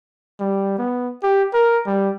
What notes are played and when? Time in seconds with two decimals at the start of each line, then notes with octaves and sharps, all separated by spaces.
0.40 G3
0.78 B3
1.23 G4
1.54 A#4
1.86 G3